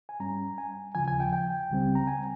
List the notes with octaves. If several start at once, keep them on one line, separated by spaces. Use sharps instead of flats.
G#5
G2 G3 C#4 A#5
G#5
D#2 C#3 F3 G#5
G#5
G5
G5
C#2 C#3 G3 C4
A#5
G#5